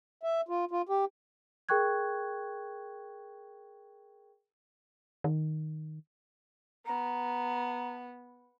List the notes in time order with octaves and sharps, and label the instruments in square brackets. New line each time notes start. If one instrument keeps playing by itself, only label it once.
[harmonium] E5
F4
F4
G4
[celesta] G#4 A#4 G5 C#6 F#6 G#6
[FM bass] D#3
[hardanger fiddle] B3 [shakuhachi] A#5